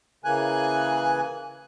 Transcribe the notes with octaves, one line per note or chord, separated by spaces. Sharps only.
C#3 E3 A#3 G#5 F#6